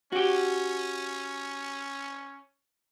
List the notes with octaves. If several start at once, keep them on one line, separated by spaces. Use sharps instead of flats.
C#4 F#4 G4